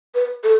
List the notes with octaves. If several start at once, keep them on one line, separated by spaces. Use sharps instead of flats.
B4
A4